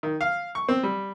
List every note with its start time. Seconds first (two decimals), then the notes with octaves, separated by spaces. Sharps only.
0.03 D#3
0.21 F5
0.55 C#6
0.68 C4
0.83 G3